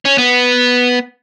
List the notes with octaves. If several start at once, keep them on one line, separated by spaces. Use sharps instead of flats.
C#4
B3